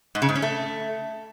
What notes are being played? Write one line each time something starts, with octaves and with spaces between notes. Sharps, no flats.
G#2
C#3
G#2
C#4
A3